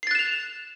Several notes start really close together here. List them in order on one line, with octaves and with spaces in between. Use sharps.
C7 A6 F#6 E7 F7